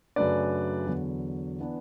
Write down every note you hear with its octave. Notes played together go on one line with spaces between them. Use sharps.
F#2 C#3 F#3 A3 D4 B4 D5
E2 D3 F#3
E3 B3 D4